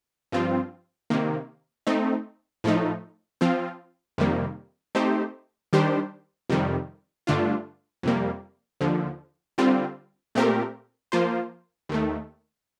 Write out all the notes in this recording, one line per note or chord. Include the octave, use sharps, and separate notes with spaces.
G2 F3 C4 F4
C3 D#3 A#3
A3 C4 D#4
A2 F3 A3 D#4
F3 C4 F4
F2 C3 D#3 G3 A#3
A3 C4 D#4 G4 C5
D#3 G3 D4 G4 C5
F2 C3 D#3 G3
G2 D3 A3 D4 F4
F2 C3 G3 A#3
D#2 D3 F3
D3 G3 C4 F4
A#2 A3 C4 G4 A#4
F3 A#3 F4 C5
D#2 D#3 A3